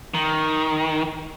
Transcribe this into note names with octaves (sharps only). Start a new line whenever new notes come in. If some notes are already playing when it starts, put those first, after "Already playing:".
D#3